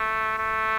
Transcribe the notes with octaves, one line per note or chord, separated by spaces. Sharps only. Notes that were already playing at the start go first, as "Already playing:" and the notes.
Already playing: A3
A3